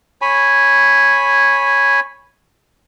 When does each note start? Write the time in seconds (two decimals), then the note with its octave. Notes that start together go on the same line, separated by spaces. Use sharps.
0.22 C#5 G#5 B5